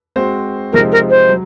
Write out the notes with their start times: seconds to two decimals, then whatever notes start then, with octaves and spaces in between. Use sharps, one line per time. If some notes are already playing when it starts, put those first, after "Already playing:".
0.16 G#3 C4 F#4 C5
0.72 C3 F3 G#3 C4 D#4 A#4
0.91 A#4
1.10 C5
1.29 F#3